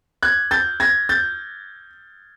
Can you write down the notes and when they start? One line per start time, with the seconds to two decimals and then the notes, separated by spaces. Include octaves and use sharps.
0.23 F#6 G#6
0.51 G6 A6
0.80 G#6 A#6
1.09 G6 A6